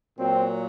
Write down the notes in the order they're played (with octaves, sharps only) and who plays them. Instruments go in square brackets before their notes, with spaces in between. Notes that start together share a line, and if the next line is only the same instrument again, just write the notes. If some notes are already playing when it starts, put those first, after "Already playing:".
[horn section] A#2 F#3 C4